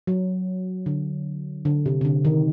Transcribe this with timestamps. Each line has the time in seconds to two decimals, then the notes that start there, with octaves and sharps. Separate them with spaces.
0.07 F#3
0.86 D3
1.65 D3
1.86 C3
2.01 C3
2.05 D3
2.25 D#3